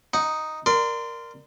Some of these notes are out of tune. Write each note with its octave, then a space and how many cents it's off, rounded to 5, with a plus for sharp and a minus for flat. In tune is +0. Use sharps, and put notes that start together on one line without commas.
D#4 +0 F#5 +0
A#4 +0 D5 +20 C6 -20